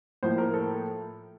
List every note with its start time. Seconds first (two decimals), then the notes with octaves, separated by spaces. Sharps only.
0.23 A2 F3 A#3 C5
0.38 A#4
0.54 A4